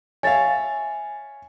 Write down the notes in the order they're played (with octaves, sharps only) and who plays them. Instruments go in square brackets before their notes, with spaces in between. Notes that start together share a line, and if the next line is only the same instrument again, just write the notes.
[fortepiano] C#5 E5 F5 [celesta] G#5 A6